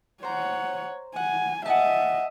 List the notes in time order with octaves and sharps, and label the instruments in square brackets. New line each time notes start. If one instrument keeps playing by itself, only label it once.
[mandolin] C5 A#5 [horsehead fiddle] C#5 F#5
[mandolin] F#5 [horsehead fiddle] G#5
[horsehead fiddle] D#5 E5 [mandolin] F#5 G#5 A5